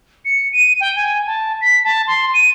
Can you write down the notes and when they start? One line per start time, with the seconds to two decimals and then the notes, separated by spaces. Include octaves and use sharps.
0.25 C#7
0.53 D#7
0.81 G5
0.96 G#5
1.27 A5
1.61 B6
1.84 A5
2.07 C6
2.34 D#7